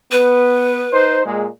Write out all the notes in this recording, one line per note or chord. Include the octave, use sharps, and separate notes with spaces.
B3 B4
D#4 C5
A#2 G#3